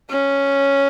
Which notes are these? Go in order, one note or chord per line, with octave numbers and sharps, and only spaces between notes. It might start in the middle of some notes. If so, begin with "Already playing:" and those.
C#4